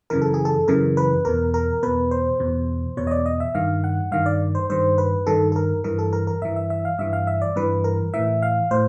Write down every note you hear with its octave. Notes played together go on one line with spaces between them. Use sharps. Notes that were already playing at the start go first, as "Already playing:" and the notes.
F#2 C#3 E3 A#4
A4
G#4
A4
F#2 C#3 E3 A#4
B4
E2 B2 A#4
A#4
E2 B2 B4
C5
E2 B2
E2 B2 C#5
D#5
D5
D#5
E5
G2 D#3 F5
F#5
G2 D#3 F5
D5
C5
G2 D#3 C5
B4
G2 D#3 A4
A4
A#4
G2 E3 A#4
A4
A#4
A#4
G2 E3 E5
E5
E5
F5
G2 E3 E5
F5
E5
D5
G2 E3 B4
A#4
A2 E3 E5
F5
A2 C5